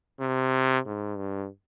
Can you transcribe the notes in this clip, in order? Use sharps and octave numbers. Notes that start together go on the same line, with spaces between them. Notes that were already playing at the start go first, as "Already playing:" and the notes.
C3
G#2
G2